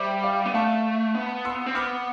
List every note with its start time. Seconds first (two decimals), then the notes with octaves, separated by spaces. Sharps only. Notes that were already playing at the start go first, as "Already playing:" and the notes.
Already playing: G3 C5 E5
0.23 D5 F5
0.46 B3
0.54 A3 F5 A5
1.15 B3
1.45 C6 E6
1.66 C4
1.75 B3 D6 F6